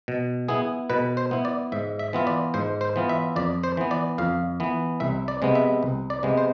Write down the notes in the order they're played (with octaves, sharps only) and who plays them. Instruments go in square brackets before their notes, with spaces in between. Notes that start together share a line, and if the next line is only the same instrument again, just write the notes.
[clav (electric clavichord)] B2
B3 E4 G#4
B2 B4
C5
B3 E4
D5
G#2 E5
E5
E3 B3 F4 E5
D5
G#2 C5
C5
E3 B3 F4
E5
F2 D5
C5
E3 B3
D5
F2 F5
E3 B3
C2 E5
D5
C3 G#3 B3
E5
C2
D5
C3 G#3 B3
C5